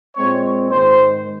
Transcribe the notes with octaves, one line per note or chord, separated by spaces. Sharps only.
A#2 G#3 C4 C#5
G#2 D#3 G#3 C5